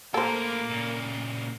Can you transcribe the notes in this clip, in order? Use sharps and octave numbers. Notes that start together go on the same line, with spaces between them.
A2 A#3 A4 A#4 C5
A#2 C#3